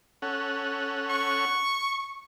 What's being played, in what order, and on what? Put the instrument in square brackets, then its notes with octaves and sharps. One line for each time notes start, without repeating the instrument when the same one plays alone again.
[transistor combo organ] C#4 A4 F#5
[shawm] C#6